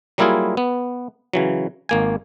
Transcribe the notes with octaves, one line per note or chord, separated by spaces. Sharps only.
F#3 G3 A#3 E4 F4 G#4
B3
C#3 E3 F#3
G#1 A#3 G#5